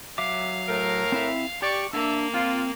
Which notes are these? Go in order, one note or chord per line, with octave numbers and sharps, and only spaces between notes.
F#3 E5 F5 D6
A2 A3 A#4
C4 E4 E5
G4 D5 C#6
A#3 D4 E5
C4 F4